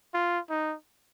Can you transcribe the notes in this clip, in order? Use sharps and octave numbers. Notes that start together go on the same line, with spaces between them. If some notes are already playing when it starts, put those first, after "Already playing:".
F4
D#4